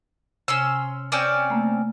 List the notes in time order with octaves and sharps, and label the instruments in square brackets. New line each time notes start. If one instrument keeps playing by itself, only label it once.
[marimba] C3 [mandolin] C#4 C6 E6
[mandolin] C4 C#4 D5
[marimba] A3 A#3